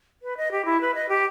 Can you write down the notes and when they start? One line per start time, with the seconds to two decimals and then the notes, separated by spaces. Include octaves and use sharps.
0.22 B4
0.37 D#5
0.52 G4
0.65 E4
0.81 B4
0.95 D#5
1.09 G4